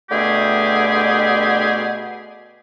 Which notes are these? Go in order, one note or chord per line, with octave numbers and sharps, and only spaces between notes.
B2 D3 A3 G4 G#4